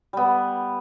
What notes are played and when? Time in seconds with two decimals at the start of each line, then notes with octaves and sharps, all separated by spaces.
0.13 G3 B3